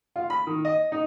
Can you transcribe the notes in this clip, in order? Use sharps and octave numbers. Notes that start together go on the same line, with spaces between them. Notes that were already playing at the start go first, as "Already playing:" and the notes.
F4
B5
D#3
D#5
D#4